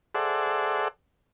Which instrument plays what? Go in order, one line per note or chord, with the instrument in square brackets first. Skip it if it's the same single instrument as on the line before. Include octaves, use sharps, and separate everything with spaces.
[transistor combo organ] G#4 A4 C5 D5 E5 F#5